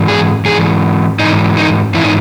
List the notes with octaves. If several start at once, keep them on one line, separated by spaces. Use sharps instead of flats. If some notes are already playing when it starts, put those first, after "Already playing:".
Already playing: G#2 E3
G#4
G#2 E3 G#4
G#2 E3 D#4
D#4
G#2 E3 E4
D#4